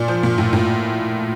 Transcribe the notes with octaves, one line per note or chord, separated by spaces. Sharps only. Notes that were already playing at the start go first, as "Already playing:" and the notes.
Already playing: A#2 D5
F3
A#2
A2
A2